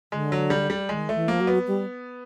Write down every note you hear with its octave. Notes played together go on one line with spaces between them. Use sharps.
D3 G#3
F#3
G3
G3
D#3 G#3
A3
E3
F3 A#3
F#3
B3
G3